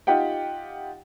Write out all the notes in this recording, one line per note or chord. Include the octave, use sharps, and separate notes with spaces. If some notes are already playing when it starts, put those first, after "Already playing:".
D#4 F4 G4 F#5 G5